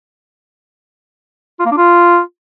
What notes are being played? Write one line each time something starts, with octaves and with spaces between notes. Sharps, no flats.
F4
A#3
D4
F4